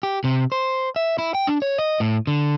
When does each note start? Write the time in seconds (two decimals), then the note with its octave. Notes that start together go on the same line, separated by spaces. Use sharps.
0.03 G4
0.24 C3
0.52 C5
0.96 E5
1.18 E4
1.35 G5
1.47 D4
1.62 C#5
1.78 D#5
2.00 A2
2.27 D3